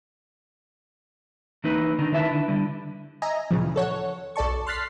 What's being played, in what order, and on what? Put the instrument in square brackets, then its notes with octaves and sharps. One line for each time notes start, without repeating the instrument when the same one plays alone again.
[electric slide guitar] E3 A#3 C4 D#4 B4
D3 D#3 D#4
D#3 E4 B4 E5 A5
D3 E4
D3 G3
[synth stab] D#5 E5 G#5 A#5
D2 A#2 C#3 E3 F3
A4 C#5 F#5
B1 A4 D5 A5 C#6
C6 F6 F#6 A6 B6 C7